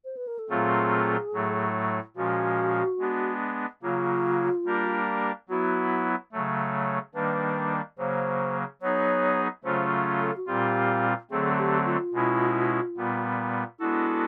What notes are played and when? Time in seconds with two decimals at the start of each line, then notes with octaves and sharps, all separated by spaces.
0.05 C5
0.17 B4
0.27 A#4
0.39 A4
0.50 A#2 F#3 A3 C4 F4 G#4
1.33 A2 F#3 A3
2.16 A#2 F3 G#3 C#4 F#4
2.99 G#3 B3 D4
3.83 C#3 F#3 A#3 F4
4.66 G3 A#3 D4 G4 A#4
5.49 F#3 B3 E4 F#4
6.32 C#3 F#3 A3
7.14 D#3 G3 A#3 D4 B4
7.98 C#3 F#3 A#3 C5
8.81 F#3 B3 D#4 G#4 C#5
9.64 C#3 F#3 A3 C#4 F4 C5
10.20 A4
10.37 F#4
10.47 A#2 G3 C4 F4 G4
11.30 D3 F#3 A3 C4 G#4
11.58 G4
11.85 F4
12.13 B2 G#3 C#4 E4
12.97 A#2 G3 B3
13.79 G#3 B3 D4 E4 F#4 A4